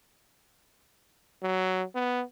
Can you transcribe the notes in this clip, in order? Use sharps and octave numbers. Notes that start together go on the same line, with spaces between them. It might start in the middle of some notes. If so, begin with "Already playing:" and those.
F#3
B3